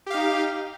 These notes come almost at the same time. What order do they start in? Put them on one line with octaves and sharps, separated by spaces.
G4 F5 D#4